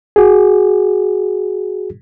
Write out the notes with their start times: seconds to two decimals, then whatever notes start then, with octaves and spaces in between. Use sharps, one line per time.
0.16 F#4 G#4